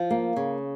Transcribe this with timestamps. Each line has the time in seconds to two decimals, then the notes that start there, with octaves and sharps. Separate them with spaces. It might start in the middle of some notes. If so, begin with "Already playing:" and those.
Already playing: F3
0.11 A#3
0.36 C#3